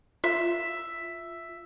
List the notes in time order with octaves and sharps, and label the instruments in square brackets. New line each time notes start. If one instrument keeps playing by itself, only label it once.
[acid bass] F4 [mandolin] E5